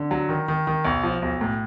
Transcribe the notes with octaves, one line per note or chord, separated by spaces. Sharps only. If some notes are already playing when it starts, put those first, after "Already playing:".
Already playing: D3
F#3
D#3
D#3
D#3
B1
F3
B1
A2